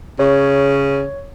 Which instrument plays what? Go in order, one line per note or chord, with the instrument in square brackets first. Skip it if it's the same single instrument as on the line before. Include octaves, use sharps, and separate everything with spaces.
[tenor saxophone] C#3 [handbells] C#5